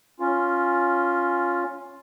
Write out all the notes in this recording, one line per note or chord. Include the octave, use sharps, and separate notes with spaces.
C#4 F4